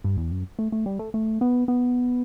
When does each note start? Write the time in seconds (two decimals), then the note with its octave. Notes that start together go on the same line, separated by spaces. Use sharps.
0.04 G2
0.17 E2
0.31 F#2
0.59 A3
0.72 A3
0.86 G3
0.99 A3
1.14 A3
1.41 B3
1.68 B3